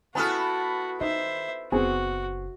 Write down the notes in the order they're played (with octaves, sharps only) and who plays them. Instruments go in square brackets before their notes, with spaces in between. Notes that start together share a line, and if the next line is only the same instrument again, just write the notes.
[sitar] B3 E4 A4 [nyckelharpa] F#4 [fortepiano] G#5 D#6 F6
[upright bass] D#3 [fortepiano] D#4 [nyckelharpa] C5 E5
[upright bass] F#1 [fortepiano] B3 C4 G#4 [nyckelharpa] F#4